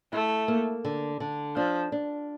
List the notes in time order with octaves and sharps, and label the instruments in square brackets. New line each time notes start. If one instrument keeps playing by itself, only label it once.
[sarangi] A3 [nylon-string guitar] E4
[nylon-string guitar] A#3
D3
D3
[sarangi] F3 [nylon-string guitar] D4
[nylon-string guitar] D4